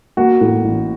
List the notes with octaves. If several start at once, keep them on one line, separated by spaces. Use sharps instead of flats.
A#3 F#4
A2
A1